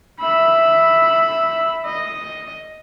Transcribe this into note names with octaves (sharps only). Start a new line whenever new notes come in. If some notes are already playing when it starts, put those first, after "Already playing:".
E5 B5
D#5